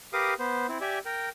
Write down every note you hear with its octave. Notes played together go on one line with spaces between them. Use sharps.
G4 A#4 B4 F5 D6 D#6
B3 C5
C4 E4
G4 D5 E5 G#5
A#4 G5